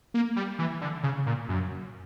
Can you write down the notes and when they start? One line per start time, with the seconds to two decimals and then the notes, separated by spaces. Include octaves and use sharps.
0.14 A#3
0.36 G3
0.59 E3
0.81 D3
1.03 C#3
1.26 A#2
1.49 F#2